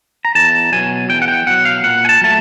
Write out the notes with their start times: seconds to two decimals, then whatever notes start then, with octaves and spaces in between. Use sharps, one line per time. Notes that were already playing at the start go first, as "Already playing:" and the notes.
0.25 A#5
0.35 E2 A5
0.72 B2 F#3 G#5
1.10 E2 G5
1.22 F#5
1.28 G5
1.47 B2 F#3 F#5
1.65 F5
1.84 A#2 F#5
2.05 G#5
2.09 A5
2.21 F#3 A3 A5